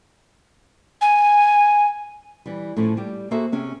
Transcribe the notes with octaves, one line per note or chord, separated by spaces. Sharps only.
G#5
E3 G3
A2 F3 A3 C#4
G3 G4
A#3 F#4 G#4 A4 C5 E5
C3 C#4 G#4 G5